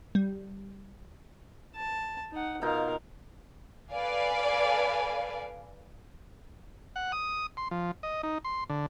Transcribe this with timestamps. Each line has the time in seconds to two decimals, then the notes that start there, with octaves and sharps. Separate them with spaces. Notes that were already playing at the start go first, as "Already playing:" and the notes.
0.15 G3
1.76 A5
2.32 D#4 F#5
2.62 B2 D#4 F4 A#4 F5
3.92 A4 B4 D5 F5 G#5
6.96 F#5
7.12 D#6
7.57 C6
7.71 F3
8.03 D#5
8.23 D#4
8.44 C6
8.70 D3